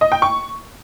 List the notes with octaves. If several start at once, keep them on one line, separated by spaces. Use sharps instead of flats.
D#5
G5
C#6